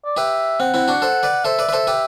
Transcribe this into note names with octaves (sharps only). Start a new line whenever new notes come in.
D5
G4 B4 E5
C4 F#5
C4 E4
D4 F#4
A4 C5
B4 D5
A4 C5 E5
B4 D5
B4
A4 C5
G4 B4